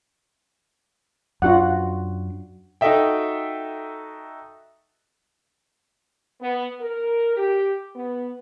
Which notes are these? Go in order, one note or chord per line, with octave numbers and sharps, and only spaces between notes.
F#2 D4 F4 F#4 F#5
D#4 F#4 A4 D#5 E5 G5
B3
A#4
G4
B3